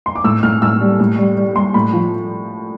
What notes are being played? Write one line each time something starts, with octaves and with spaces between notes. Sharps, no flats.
C6
D6
A2 E6
A2 F6
A2 E6
G3
A2
G3
G3
G3 C6
A2 B5
F3